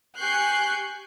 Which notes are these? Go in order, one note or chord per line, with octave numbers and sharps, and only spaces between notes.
G4 G#5 C#6 F#6 G6 C7